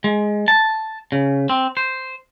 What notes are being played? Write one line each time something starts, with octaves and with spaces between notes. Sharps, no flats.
G#3
A5
C#3
C4
C5